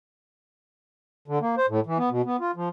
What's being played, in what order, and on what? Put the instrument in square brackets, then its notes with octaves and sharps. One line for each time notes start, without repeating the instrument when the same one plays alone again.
[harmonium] D3
A#3
C5
A2
E3
B3
B2
B3
F4
F3